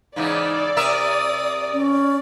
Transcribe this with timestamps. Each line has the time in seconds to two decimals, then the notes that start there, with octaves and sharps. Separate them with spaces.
0.16 G#2 C#3 E3 D#4 D5
0.77 C3 A#4 E5 D#6
1.73 C#4